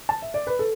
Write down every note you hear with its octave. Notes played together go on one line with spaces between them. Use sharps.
A5
E5
D5
B4
A4